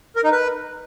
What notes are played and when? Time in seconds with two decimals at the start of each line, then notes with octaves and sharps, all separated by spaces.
0.16 A#4
0.24 D#4
0.32 B4